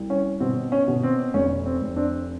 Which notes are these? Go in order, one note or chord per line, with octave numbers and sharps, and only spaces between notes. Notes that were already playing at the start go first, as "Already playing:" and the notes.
Already playing: C2
C#4
B2 C4
C#4
B2
C4
F1 C#4
C4
F1
C4 D4